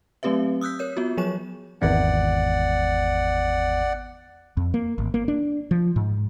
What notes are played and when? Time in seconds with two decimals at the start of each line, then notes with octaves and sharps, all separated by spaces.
0.23 F#3 A3 C4 G4 B4 E5
0.61 D#6 E6 F#6 G6 B6
0.79 A#4 C#5 G6
0.97 B3 F4 F#4
1.17 F3 F#3 G#4 C#5 C#6 E7
1.82 G#1 E2 B3 D5 F#5
4.57 F2
4.74 A#3
4.98 G#1
5.14 A#3
5.28 D4
5.71 F3
5.96 G#2